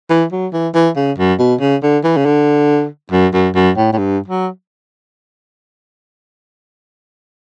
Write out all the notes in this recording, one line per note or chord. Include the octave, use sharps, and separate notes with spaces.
E3
F#3
E3
E3
C#3
F#2
B2
C#3
D3
E3
C#3
D3
F#2
F#2
F#2
A2
A2
G2
F#3